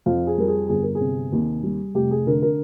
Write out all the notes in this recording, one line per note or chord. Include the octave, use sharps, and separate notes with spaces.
F2 F5
G#4
G3 A#4
G#4
G1 G#4
A#4
G#4
C3
D#2
G3
F1 G4
G#4
D3 A#4
A#4